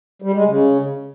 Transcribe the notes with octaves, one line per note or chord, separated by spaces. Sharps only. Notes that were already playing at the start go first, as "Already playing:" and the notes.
G3
G#3
C#3